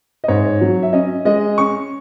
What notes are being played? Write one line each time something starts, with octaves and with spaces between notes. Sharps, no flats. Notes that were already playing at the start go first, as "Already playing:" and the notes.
D#5
G#2 C#5
F#3
E5
C#4 D#5
G#3 D#5
C#4 C#6